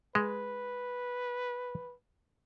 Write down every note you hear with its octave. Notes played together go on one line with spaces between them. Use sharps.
G#3 B4